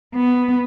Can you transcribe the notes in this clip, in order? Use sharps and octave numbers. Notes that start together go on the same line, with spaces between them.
B3